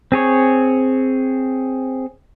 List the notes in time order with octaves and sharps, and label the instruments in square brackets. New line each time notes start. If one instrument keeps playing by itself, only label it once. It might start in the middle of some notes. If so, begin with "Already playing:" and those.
[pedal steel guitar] C4 G#4 C#5